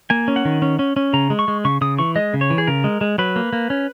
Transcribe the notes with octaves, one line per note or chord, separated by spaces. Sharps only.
A#3 G#5
C#4
F#5
D#3
C#4
C#4
C#4
C#3 A#5
G#3
C#6
G#3
C#3 C#6
C#3 D#6
E3 C#6
G#3 D#5
C#3
C#5
E3
G#4
C#3 A#4
G#3
G#3
F#3 B4
A#3
A#3
C#4